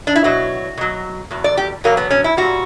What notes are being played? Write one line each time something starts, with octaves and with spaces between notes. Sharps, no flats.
D4
E4
B2 F#3 F#4
B2 F#3
E2 B2
D5
G4
E2 B2 F#3 A#3
B3
C#4
E4
A#2 G3 F#4